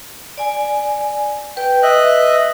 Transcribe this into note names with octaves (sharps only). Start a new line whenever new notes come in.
D5 G#5
B4 G5
D#5 E5 F#6